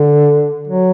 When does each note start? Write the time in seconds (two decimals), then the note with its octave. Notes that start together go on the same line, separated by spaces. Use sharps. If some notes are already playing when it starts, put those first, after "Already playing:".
Already playing: D3
0.68 F#3